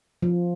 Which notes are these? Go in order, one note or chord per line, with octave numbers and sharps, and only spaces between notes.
F3